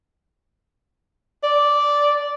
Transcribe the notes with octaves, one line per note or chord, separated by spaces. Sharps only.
D5